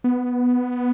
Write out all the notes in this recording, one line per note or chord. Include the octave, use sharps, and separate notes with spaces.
B3